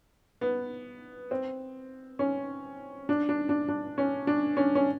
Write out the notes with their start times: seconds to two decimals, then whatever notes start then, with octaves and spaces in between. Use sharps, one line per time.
0.41 B3
1.31 C4
2.19 C#4
3.09 D4
3.29 D4
3.49 D4
3.69 D4
3.98 C#4
4.27 D4
4.57 C#4
4.75 C#4